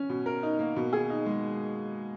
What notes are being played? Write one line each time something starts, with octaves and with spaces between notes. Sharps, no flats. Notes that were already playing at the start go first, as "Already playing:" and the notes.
Already playing: C#4
B2
A#4
D#4
A#3
B2
G#4
D#4
G#3